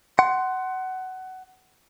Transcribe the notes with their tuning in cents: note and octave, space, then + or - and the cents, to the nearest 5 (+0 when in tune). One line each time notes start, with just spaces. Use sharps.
F#5 +20 C6 +0